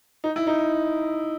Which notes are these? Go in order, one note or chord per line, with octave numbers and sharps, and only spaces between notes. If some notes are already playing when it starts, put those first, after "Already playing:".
D#4
E4
D#4